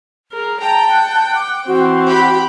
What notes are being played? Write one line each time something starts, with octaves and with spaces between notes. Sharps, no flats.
G#4 A#4
G5 A5 A#5
F#5
D6
E3 C4 F#4
G4 B5